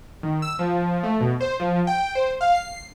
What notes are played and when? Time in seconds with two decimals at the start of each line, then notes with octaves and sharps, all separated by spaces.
0.23 D#3
0.42 E6
0.59 F3
1.03 A3
1.21 B2
1.41 C5
1.60 F3
1.87 G5
2.15 C5
2.41 F5
2.55 C7